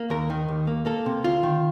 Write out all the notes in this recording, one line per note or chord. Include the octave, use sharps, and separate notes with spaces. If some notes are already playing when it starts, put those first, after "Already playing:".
Already playing: A#3
D#2 A#4
D#3
D#2
A#3
A#3 A4
C3
D2 F4
D#3